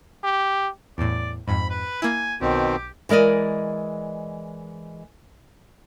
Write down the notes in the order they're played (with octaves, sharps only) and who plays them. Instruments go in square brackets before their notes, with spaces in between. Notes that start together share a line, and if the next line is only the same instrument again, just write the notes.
[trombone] G4
[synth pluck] E2 A2 [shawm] D5
[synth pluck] F2 G#2 [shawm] B5
[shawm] B4
[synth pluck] A#3 E4 [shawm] G#5
[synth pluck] B1 [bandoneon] B2 D#3 C4 [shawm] G4
[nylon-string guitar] E3 G#3 A#4 D5 D#5